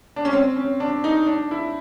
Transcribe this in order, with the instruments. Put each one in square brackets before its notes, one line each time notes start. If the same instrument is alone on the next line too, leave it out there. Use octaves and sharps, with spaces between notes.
[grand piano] D4
C#4
C4
C#4
D4
D#4
D4
E4